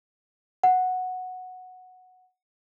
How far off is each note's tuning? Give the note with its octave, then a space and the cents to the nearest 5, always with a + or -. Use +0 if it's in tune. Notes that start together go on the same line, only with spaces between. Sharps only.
F#5 -5